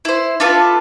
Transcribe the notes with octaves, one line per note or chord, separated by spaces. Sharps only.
E4 C5
D4 F4 A4 B4